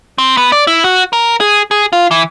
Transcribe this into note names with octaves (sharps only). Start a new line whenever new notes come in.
C4
B3
D5
E4
F#4
A#4
G#4
G#4
F4
E3